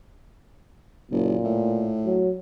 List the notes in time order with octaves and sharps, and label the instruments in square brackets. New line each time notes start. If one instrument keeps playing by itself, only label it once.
[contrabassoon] F#1 [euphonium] A#2
[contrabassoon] A2
[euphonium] F#3